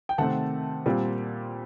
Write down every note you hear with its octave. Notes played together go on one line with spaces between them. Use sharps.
G5
C3 D#3 A3 C4 F#5 A5
A#2 G3 C4